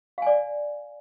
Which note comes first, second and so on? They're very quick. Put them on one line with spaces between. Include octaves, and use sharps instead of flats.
F5 G#5 D5